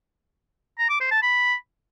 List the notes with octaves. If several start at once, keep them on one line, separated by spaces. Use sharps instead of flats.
A#5
D6
C5
A5
B5